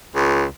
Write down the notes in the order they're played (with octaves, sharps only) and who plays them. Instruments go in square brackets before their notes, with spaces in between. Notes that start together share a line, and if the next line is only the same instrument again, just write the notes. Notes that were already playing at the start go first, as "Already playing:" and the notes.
[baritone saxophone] C#2